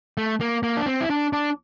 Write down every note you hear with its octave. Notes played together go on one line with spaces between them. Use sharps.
A3
A#3
A#3
D4
C4
E4
D4
D4